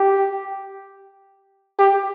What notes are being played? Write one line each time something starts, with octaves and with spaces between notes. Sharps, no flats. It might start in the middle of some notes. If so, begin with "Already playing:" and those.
Already playing: G4
G4